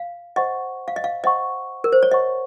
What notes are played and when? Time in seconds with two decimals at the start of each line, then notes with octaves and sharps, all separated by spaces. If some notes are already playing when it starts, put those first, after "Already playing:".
Already playing: F5
0.36 C5 D#5 F#5 C#6
0.88 F5
0.96 D#5
1.04 F5
1.24 C5 D#5 F#5 C#6
1.84 A#4
1.92 C5
2.03 C#5
2.11 C5 D#5 F#5 C#6